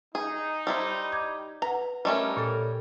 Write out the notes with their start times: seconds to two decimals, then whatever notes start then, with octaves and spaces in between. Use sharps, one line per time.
0.15 D#4 G#4
0.67 G3 E4 C5
1.12 D6 G6 G#6
1.62 B4 F#5 A#5
2.05 G3 A3 C#4 A#4 D#5 E5
2.37 A#2 A4